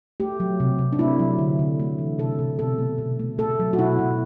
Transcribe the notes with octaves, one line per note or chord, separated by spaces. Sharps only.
A3 G4
F#3
C3
C3
D4
A3 E4
F#3
D3
D3
A3
E3
C3 A4
C3
B2 A4
A3
B2
A3
A3 A4
F#3
F#4
B2 E4
B2